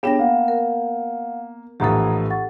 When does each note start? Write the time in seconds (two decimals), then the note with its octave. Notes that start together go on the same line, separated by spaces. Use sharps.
0.03 B3 D4 G4 G#4 C#5 G5 A#6 E7
0.19 A#3 F5 F#5
0.48 A#4
1.80 A#1 A2 E3 G4 A4 F#5 A#5 D#6
2.30 F#5 C#6 A6